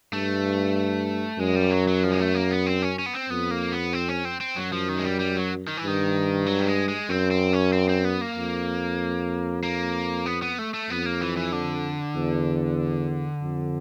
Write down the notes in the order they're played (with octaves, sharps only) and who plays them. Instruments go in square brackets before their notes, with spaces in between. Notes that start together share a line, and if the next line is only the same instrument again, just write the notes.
[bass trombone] G2 [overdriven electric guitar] A3
[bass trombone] F#2 [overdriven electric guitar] G#3
[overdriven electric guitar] G3
F#3
F#3
F3
G#3
A3
A#3
B3
C4
C#4
C#4
B3
C4
[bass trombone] F2 [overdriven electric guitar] B3
[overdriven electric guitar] A#3
B3
C4
C#4
C4
C4
[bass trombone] F#2 [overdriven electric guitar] F#3
[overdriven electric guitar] F3
D#3
G#3
G3
G3
F#3
D#3
E3
[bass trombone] G2 [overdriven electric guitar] D#3
[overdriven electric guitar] F#3
G3
G#3
G#3
[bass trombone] F#2 [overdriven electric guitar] C4
[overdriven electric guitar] C4
C#4
C4
C4
B3
A#3
[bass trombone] F2
[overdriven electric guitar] A#3
B3
B3
A3
A3
[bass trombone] F2 [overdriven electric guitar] B3
[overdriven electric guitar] A#3
E3
E3
D3
[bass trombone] E2
F2